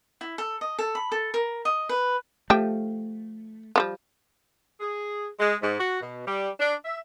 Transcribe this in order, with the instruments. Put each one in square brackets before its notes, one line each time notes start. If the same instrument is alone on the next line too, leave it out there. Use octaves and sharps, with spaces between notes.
[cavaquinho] E4
A4
D#5
A4
B5
A4
A#4
D#5
B4
[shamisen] F3 G4 G5 [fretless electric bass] A3
[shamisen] F3 G3 B3
[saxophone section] G#4
G#3
G#2
F#4
B2
G3
D4
E5